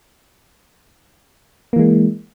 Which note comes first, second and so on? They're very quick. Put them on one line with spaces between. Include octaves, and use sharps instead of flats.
A#3 E3 G#3